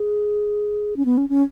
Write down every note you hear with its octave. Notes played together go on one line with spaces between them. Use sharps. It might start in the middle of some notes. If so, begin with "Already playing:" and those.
Already playing: G#4
C#4
B3
C#4
C#4